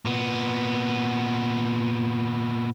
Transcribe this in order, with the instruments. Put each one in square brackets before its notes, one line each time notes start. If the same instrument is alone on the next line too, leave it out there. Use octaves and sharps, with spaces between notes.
[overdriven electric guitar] A#2 B3